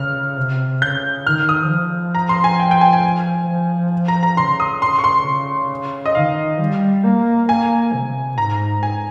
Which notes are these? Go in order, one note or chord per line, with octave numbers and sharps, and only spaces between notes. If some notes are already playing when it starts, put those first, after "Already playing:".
Already playing: C#3 F6
C3
C#3 G6
D#3 F6
D#6
F3
A#5
C6
G#5
G5
G5
G#5
G#5
F3
A#5
A#5
C#3 C6
D#6
C6
C#6
C6
C#3
D#5
D#3 F5
G3
A#3
A#3 G#5
C3
G#2 A#5
G#5